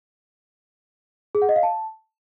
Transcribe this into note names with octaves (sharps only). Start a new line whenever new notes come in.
G#4
F#5
D#5
F5
A5